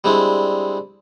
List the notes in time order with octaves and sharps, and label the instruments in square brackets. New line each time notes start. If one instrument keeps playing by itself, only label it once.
[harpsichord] G3 G#3 C4 D4 E4